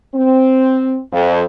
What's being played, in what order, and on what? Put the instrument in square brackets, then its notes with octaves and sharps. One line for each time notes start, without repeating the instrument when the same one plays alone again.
[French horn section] C4
F2